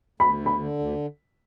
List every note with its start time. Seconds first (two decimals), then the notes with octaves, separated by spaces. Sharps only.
0.20 D2 B5
0.40 D3
0.46 B5
0.59 D3
0.79 D2